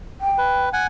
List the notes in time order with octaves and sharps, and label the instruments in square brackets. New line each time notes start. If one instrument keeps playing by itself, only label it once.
[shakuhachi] G5
[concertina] B4
F#5 G#5